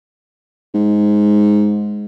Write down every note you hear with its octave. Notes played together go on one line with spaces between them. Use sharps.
G#2